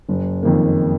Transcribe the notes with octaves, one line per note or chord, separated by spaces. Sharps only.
F#1
F2 D#3 A#3